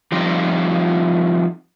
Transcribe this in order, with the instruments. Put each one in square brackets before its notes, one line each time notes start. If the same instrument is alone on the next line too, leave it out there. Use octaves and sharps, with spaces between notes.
[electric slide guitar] F3 G3 C4 D#4 F4 G4